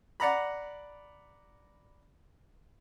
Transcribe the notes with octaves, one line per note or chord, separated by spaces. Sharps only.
D5 F#5 A#5 B5